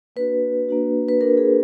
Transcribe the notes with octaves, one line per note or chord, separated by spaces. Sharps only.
A#3 D4 F#4 B4
A#3 D4 F#4
B4
A#3 D4 F#4 A#4
G#4